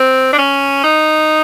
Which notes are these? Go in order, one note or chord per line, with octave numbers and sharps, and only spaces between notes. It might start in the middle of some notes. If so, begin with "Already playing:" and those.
Already playing: C4
D4
C#4
D#4